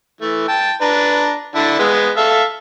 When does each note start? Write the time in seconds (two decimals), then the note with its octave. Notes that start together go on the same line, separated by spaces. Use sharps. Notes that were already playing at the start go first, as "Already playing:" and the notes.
0.21 E3 A3
0.48 G5 A5
0.81 D4 B4 A#5
1.55 D3 D4 E4
1.79 G#3 B3
2.17 A4 E5 F5